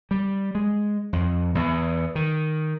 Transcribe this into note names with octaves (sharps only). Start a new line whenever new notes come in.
G3
G#3
F2
E2
D#3